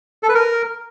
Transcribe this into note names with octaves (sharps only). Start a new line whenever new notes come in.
A4
B4
A#4